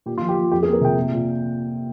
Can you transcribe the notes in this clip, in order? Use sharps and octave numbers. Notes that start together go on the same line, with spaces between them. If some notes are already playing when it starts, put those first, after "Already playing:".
A#2 G4
F4
F3
G4
F3
F2 G4
G#4
A#3
A#4
C3 G5
A#2
A#2